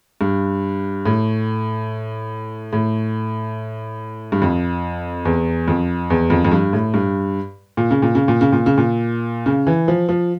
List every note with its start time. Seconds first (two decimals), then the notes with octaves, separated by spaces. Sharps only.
0.21 G2
1.06 A2
2.73 A2
4.32 G2
4.42 F2
5.25 E2
5.68 F2
6.10 E2
6.30 F2
6.45 F2
6.52 G2
6.73 A2
6.94 G2
7.77 A#2
7.91 C#3
8.02 A#2
8.15 C#3
8.28 A#2
8.41 C#3
8.52 A#2
8.66 C#3
8.78 A#2
9.46 C#3
9.67 E3
9.88 F3
10.09 F3